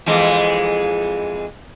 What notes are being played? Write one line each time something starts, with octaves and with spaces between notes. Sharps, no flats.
F2 E3 G#3